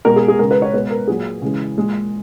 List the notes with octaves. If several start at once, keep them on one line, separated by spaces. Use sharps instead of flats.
B2 G#3 A#4
G#4
G#4
C#3 G#3 A#4
B4
C#5
B2 G#3 B4
A#4
A#2 F#3 G#4
C#3 E3 G#3
A#2 G#3